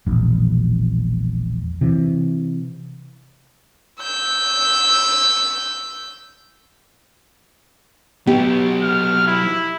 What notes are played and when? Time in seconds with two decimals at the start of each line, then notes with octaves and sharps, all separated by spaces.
0.07 E1 A#1
1.81 C3 E3
4.02 E6 G6
8.27 F#3 B3 D#4 G4
8.83 F6
9.27 E4